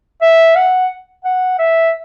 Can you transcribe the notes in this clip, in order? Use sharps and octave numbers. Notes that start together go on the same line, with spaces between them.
E5
F#5
F#5
E5